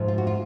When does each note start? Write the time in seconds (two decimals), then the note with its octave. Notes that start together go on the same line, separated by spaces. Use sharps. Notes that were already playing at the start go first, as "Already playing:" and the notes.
Already playing: G#2 F3 A3
0.08 F4
0.18 F#4
0.27 F4